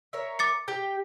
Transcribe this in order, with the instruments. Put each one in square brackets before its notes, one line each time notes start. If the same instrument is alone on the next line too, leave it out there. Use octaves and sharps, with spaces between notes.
[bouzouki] A#4 C#5 E5
[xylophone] D6 A6 C#7
[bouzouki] G4 G5